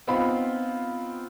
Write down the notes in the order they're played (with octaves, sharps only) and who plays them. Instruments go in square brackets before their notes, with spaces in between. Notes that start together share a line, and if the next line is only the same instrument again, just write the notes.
[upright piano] B3 C4 D#4 F4 F5 B5